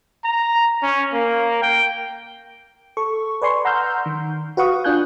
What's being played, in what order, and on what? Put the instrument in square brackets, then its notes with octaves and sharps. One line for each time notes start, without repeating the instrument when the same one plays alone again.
[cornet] A#5
C#4
A#3
G5
[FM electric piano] A4 C#6
B4 D5 G#5 C6 C#6
F#5 A#5 C6 E6 F6 G6
D#3
F#4 B4 F5 F#5 C#6 D#6
D4 F4 G#5 F#6 G6